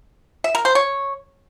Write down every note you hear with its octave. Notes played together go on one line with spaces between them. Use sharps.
E5
A#4
C5
C#5